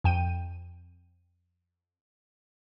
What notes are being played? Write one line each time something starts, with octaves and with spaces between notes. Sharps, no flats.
F2 G5 D#7